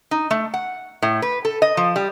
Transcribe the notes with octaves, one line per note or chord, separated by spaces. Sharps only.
D#4
A3
F#5
A2
B4
A4
D#5
F3
G3